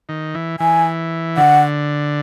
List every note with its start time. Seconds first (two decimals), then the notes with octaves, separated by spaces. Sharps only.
0.09 D#3
0.34 E3
0.60 E3 G#5
1.37 D3 F#5